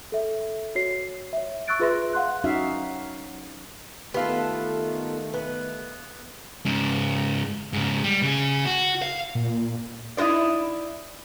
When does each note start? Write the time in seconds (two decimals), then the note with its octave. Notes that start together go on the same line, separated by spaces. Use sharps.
0.12 A4 E5
0.75 F#4 C#5 C7
1.33 C#5 E5
1.68 C#6 E6 F#6 A6 D7
1.79 F4 G#4 B4 E5 C6 A#6
2.13 F5 F#5 C6 F#6
2.44 F#3 C#4 D#4 F#4 E5 F5
4.14 D#3 A3 B3 F4 G4 A4 F5
5.34 B3
6.65 G#2 C#3
7.73 G#2 C#3
8.04 G3
8.23 C#3 G#4
8.65 F#4
9.02 F5
9.35 A#2
10.17 D#4 E4 F#4 C5 D5